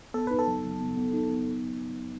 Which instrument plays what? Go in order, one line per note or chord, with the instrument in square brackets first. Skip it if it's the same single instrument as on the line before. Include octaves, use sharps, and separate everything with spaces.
[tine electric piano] B3 [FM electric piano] A4
[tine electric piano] D#4 [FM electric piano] B4
[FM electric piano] A4
[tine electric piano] F#3
F#3
B3
B3
D#4
B3